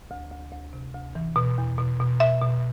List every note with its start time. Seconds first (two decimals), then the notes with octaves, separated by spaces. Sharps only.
0.11 D2
0.31 D2
0.52 D2
0.73 C3
0.94 D2
1.15 E3
1.36 B2
1.58 E2
1.78 B2
2.00 B2
2.20 B2 E5
2.42 B2